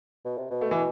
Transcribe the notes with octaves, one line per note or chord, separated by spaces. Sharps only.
B2
C3
B2
A3
E3